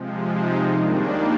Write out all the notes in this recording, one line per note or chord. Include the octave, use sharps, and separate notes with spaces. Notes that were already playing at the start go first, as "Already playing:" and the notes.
Already playing: C3 F3 G#3
D#4
D#2 D#3 G3 A#3 D4